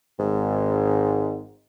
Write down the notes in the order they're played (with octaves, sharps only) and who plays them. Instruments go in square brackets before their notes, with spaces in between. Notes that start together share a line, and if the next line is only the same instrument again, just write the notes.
[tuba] G#1 [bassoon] G#2